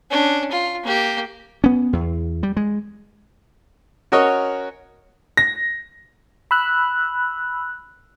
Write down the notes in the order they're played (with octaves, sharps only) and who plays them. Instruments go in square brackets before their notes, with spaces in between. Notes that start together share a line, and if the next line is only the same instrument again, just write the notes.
[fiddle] C#4 D4
F4
A#3 G4
[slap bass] B3 C#4
E2
G3
G#3
[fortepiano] C#4 F#4 A#4 C#5 D#5
[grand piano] A#6
[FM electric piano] B5 E6 F#6